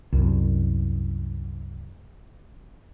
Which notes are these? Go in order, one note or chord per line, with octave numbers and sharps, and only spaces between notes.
C2 F#2